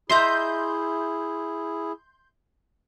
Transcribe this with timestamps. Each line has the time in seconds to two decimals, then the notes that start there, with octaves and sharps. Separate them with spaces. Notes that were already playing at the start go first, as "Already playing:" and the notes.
0.10 E4 G#4 D#5 E5 A#5 C6 G6